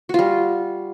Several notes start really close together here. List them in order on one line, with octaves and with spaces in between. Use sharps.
F#4 F4 G3